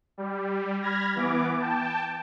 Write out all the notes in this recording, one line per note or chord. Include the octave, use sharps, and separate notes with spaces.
G3
B5 F6 G#6 A#6
E3 B3 D6
G5 A5